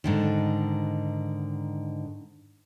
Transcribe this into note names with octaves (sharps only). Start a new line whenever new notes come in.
G#2 D3 D#3